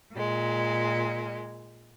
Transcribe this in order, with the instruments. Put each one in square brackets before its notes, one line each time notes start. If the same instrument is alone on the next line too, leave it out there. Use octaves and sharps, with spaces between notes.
[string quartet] A#2 G#3